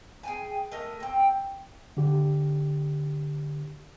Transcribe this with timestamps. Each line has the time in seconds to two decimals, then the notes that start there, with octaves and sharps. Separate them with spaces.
0.23 G#4 G5 G#5
0.72 A3 A#4 D#5
1.00 C4 G5
1.97 D3 G4